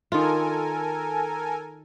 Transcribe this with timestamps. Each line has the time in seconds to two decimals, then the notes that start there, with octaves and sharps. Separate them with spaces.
0.12 D#3 F4 A4 A#4 G#5